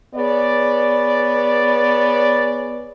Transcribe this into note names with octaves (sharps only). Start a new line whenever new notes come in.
B3 G#4 C#5 D5